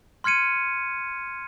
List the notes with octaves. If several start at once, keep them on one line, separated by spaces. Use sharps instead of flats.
C6 F6 G#6 C#7 D#7